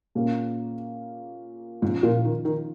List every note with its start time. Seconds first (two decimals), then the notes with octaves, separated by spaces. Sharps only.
0.15 A#2 A#3 C#4
1.82 G#2 F3 C#4 F4
2.03 A#2
2.24 D#3
2.45 D#3